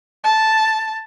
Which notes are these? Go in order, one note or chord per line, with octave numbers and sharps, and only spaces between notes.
A5